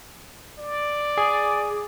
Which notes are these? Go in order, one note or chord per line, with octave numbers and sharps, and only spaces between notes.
D5
G#4